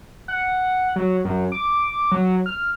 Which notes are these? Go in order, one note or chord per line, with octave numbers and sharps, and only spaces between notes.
F#5
F#3
F#2
D6
F#3
F6